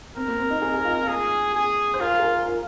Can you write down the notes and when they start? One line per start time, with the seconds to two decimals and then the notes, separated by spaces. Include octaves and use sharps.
0.17 C4 A#4
0.28 A#3
0.39 C4
0.50 D#4
0.62 G#4
0.74 G#4
0.85 F4
1.08 G#4
1.55 G#4
1.94 C5
2.00 F4 A#4
2.19 G#4
2.23 A#4
2.46 F4